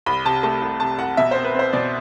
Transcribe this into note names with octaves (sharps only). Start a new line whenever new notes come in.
C2 B5
C3 A5
A3 A5
C2
C3 A5
C2 F#5
B2 E5
C5
C4
B4
C4 C5
B2 D5